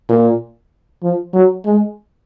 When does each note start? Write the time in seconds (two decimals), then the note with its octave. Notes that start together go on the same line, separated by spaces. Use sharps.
0.09 A#2
1.03 F3
1.34 F#3
1.66 G#3